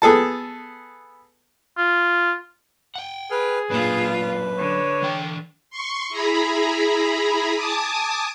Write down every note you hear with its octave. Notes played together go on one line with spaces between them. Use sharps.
B3 G#4 A4 A5
F4
F#5 G5
G#4 B4 F6
F#2 A#2 D4 F4 B4
D3 C#5
E3 G5
C6 C#6
E4 G#4 A#5 B5
G#5 A5 D6 D#6